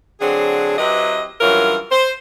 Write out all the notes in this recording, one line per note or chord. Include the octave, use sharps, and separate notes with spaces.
D3 F#3 C4 D4 G#4
F#3 C4 E4 G4 B4 D#5
G2 E3 F#3 C#4 F4 A#4
C5